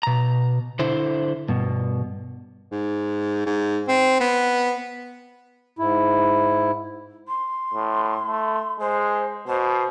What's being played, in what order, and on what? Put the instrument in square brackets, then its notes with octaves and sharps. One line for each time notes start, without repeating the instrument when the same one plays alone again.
[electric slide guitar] B2 A#5
D3 E4 C5
G2 B2
[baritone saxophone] G#2
G#2
C4
B3
[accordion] G#2 E4
[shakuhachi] C6
[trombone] A2
A3
[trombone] G#3 [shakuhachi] C5
[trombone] B2 [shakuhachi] C5